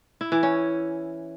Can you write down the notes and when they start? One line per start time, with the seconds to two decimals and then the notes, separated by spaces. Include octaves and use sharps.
0.21 E4
0.32 E3
0.43 C#4